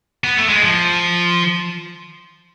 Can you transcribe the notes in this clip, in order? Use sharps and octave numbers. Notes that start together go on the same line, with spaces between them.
B3
A3
G#3
F3